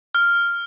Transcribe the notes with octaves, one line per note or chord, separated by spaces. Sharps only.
F6